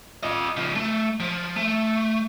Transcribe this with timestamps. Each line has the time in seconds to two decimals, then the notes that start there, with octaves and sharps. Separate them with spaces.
0.23 F4 D#5
0.57 C#3 F3
0.76 A3
1.20 F3
1.56 A3